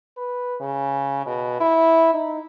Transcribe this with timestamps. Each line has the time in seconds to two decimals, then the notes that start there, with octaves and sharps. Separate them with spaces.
0.17 B4
0.61 C#3
1.26 B2
1.60 E4
2.14 D#4